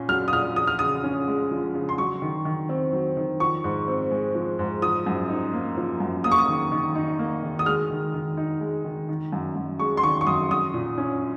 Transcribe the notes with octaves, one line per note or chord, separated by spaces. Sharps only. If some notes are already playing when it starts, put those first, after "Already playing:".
Already playing: A#2 C#4 F4
F#3 F6
D#6
A#2 F6
F3 D#6
F6
C#3 D#6
C#4
G#3
F3
C#3
C6
F#3 C#6
D#3
D#3
C4
F#3
D#3
F3 C#6
G#2
C4
G#3
F3
G#2
F3 D#6
F#2
D#4
A#3
F3
F#2
A#3 D#6
C#6
D#6
D#3
D#3
D#4
A#3
D#3
D#6
G#3 F6
D#3
D#3
D#4
G#3
D#3
D#3
F#2
F#2
G#3 C#6
C6
D#3 C#6
C#6
F#2 D#6
F#3 D#6
A#2
C#4